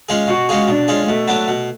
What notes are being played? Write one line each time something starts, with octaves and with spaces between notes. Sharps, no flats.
G#3 C#4 F4 G#4
B2 F#4
G#3 C#4 F4 G#4
B2 D4
G#3 C#4 F4 G#4
B2 A3
F#3 B3 D4
B2